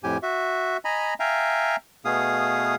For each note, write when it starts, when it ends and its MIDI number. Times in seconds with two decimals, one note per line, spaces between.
0.03 0.18 41
0.03 0.18 45
0.03 0.18 67
0.03 0.18 80
0.23 0.77 66
0.23 0.77 76
0.85 1.14 75
0.85 1.14 80
0.85 1.14 82
0.85 1.14 83
1.20 1.76 76
1.20 1.76 77
1.20 1.76 79
1.20 1.76 80
1.20 1.76 82
2.05 2.75 47
2.05 2.75 57
2.05 2.75 59
2.05 2.75 68
2.05 2.75 77
2.05 2.75 87